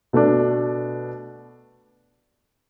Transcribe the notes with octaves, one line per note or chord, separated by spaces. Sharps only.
B2 A3 D4